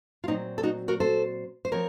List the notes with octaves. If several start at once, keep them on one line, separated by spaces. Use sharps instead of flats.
F4
A#2 F#3 C4 D#4
A4
D#4 F#4
F#4 A#4
A4 C5
C5
F3 C4 A#4 C#5